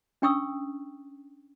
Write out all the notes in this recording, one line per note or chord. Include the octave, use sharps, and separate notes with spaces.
C#4 D4 G5 C#6 D#6 E6